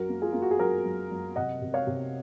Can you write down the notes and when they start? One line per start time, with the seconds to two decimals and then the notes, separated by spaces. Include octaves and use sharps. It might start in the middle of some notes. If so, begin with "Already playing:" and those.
Already playing: F#2 F#4 A#4
0.09 A#3
0.22 F4 G#4
0.33 A#3 F4
0.42 F#4
0.51 G#4
0.59 F#2 F#4 A#4
0.85 F#2
1.11 F#2
1.36 C3 D#5 F#5
1.61 C3
1.74 C#5 F5
1.87 C3